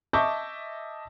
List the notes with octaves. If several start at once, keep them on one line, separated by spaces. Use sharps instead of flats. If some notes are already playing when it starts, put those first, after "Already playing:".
D#5 E5 A5 C#6 D6 G6